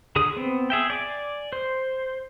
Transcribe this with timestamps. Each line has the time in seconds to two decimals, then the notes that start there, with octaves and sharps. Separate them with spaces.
0.16 D3 G#4 D#6
0.36 B3 C4
0.70 G#4 E5 G5
0.90 D5 G#5 D6
1.53 C5